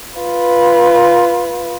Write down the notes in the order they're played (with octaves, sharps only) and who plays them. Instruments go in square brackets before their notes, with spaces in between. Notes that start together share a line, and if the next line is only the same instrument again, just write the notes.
[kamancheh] F4 B4